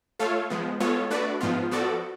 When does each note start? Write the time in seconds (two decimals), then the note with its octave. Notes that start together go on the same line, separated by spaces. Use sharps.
0.19 A3 F4 A4 C#5 F5
0.50 F3 G#3 B3
0.80 G#3 B3 F4 A4 C#5
1.10 A3 D4 F#4 B4 D5
1.41 G#2 F3 B3 F4
1.71 F3 B3 F#4 A4 D5